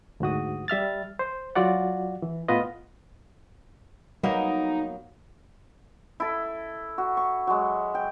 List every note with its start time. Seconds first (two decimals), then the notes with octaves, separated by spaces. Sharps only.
0.20 D2 G#2 F#4 D#6
0.68 G3 E5 F6 A6
1.19 C5
1.55 F#3 F4 F#4 D5 F#5
2.22 E3
2.48 A2 B3 F4 B4 D#5
4.23 F#3 G3 A#3 B3 D#4
6.20 E4 A4
6.98 F#4
7.17 C#6
7.47 F#3 G#3
7.95 G5